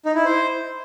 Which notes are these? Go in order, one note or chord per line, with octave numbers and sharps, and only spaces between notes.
D#4
E4
C5